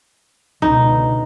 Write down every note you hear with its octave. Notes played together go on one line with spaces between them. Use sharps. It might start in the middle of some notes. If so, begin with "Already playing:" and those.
C#2 B2 D3 D#4